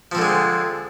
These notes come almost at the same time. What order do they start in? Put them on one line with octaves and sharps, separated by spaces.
F3 C4 D3 G#3